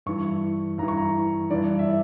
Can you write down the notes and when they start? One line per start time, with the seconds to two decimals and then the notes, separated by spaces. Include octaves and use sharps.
0.06 G2 E3 C#6
0.78 G2 E3 A#5
0.88 C#6
0.97 A#5
1.50 G2 E3 D5
1.79 E5
1.86 D5